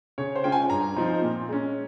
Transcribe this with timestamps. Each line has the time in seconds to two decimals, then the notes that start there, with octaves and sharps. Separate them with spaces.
0.18 C#3 C#5
0.36 C5
0.44 G#3 C#4 F4 G5
0.52 G#5
0.70 G2 A#5
0.96 F3 C4 D#4
1.22 A#2
1.49 G#3 C#4